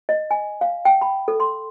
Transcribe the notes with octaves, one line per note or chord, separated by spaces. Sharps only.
D#5
G#5
F5
G5
B5
A4
C6